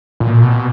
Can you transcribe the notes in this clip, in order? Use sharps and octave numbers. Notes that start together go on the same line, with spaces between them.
A#2
B2